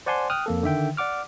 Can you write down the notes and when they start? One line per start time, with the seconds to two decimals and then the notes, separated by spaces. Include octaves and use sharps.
0.06 C5 D5 F#5 G#5 A5 C6
0.30 G5 D#6 F6 F#6
0.46 F2 A#3 A4
0.63 D3 D#3 E5 G5
0.97 D5 F#5 D6 F6